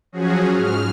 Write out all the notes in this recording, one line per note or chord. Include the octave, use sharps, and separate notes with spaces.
F3 F#3 C#4 F#4 G#4
G#2 F6